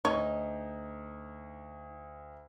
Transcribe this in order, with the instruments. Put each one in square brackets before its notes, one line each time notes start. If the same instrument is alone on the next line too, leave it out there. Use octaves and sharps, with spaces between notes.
[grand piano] D2 [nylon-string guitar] D#4 [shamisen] C#5